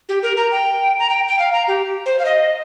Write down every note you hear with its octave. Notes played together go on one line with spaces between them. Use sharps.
G4
A#4
A#5
G5
A#5
G5
G5
F5
A#5
G4
C5
F5
D#5